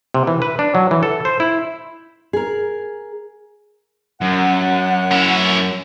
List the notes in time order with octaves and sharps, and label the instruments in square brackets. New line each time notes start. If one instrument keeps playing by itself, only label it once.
[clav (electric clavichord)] C3
E3
B4
D4
F#3
E3
A4
C5
E4
[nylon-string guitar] G#4 A#4
[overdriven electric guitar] F#2 [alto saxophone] F#5
[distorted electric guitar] C#4 E4